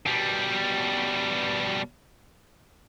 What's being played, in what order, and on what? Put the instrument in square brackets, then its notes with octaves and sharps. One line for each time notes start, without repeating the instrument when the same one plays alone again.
[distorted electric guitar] B2 G3